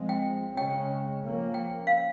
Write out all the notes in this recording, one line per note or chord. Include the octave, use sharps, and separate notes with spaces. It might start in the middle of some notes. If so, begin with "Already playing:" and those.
Already playing: F3 G#3 C4
G5
C#3 G#3 C#4 G5
F3 A#3 C#4
G5
F5